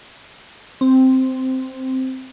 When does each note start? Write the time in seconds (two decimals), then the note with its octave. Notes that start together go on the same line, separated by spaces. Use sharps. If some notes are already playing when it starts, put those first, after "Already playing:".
0.81 C4